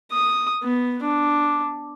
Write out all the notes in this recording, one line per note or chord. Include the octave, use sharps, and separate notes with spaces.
D#6
B3
D4